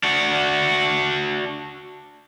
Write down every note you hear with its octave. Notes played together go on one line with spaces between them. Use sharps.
D4 F#4